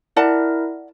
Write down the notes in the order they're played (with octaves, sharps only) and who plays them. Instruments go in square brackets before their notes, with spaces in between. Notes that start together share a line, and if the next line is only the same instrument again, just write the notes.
[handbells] E4 A#4 [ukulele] D5 F#5 A5